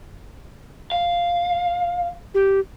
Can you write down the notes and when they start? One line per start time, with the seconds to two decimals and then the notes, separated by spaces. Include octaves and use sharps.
0.92 F5
2.34 G4